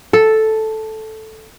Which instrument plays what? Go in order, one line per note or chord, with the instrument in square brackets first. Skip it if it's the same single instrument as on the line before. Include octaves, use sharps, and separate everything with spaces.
[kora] A4